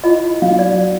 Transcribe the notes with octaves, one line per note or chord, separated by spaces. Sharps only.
E4 F4 D#5
F#3 F5
D5